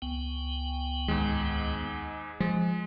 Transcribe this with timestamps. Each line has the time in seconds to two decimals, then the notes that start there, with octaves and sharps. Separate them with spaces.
0.02 C#2 B3 G5
1.08 D#2 G#2 G#3
2.40 F3 G#3